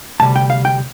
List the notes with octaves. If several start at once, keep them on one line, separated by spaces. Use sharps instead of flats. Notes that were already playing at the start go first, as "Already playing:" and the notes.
D2 C3 G3 A5
G5
F5
G5